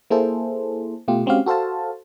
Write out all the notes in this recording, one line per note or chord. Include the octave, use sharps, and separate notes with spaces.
A#3 E4 G#4 A4 C5
B2 A3 F4 G4
G#3 C4 C#4 F#4 G4 F5
F#4 A4 C5 F5 A5